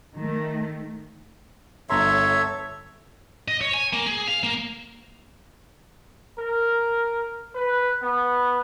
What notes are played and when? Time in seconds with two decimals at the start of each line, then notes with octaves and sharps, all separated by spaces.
0.16 D#3 A3
1.90 G1 A4 C#5 E5 A#5 C6
3.48 D#5
3.61 C#5
3.74 G#5
3.93 A#3
4.06 G#4
4.27 F5
4.43 A#3
6.39 A#4
7.54 B4
8.02 B3